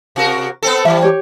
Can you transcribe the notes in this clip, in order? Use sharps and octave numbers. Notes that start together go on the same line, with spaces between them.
C3 F#4 A#4
B3 C4 A4
E3 G3 E5
G4 C#5